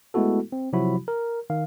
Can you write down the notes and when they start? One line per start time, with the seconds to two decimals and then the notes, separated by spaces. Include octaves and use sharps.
0.14 G#3 A3 B3 E4 F#4 A4
0.52 C4
0.73 C3 F3 F#3 E4 F#4 B5
1.08 A#4
1.50 D#3 F5